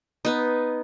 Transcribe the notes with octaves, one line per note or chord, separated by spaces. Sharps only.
B3 D#4